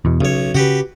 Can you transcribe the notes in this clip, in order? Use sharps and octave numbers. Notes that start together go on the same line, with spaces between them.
E2 B2
B1 C#3 C#5
C#3 F#4 G4 B4